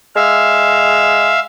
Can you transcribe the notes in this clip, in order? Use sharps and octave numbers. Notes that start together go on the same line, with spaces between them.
G#3 E5 F5